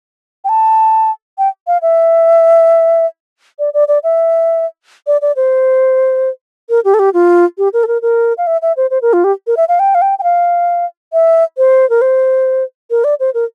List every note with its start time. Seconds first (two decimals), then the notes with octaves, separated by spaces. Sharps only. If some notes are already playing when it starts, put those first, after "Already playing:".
0.45 G5
0.49 A5
1.38 G5
1.67 F5
1.82 E5
3.59 D5
3.74 D5
3.88 D5
4.04 E5
5.07 D5
5.22 D5
5.36 C5
6.70 A#4
6.85 G4
6.94 A4
6.99 G4
7.14 F4
7.58 G4
7.73 A#4
7.83 A4
7.87 A#4
8.02 A#4
8.38 F5
8.47 E5
8.62 E5
8.77 C5
8.91 C5
9.02 A#4
9.13 F4
9.24 G4
9.47 A#4
9.57 E5
9.69 F5
9.79 G5
9.95 F5
10.02 G5
10.19 G5
10.23 F5
11.13 E5
11.57 C5
11.90 A#4
12.02 C5
12.91 A#4
13.04 D5
13.20 C5
13.34 A#4